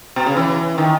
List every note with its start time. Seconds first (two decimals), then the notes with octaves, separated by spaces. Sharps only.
0.16 B2
0.26 C#3
0.37 E3
0.78 D#3